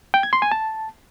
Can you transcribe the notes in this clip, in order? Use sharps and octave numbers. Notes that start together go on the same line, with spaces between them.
G5
G#6
C6
G#5
A5